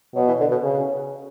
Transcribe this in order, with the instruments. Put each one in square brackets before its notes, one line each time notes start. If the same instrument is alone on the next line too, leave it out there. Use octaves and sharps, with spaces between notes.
[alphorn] B2 [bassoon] F#3
[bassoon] E3
D3
B2
[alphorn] C#3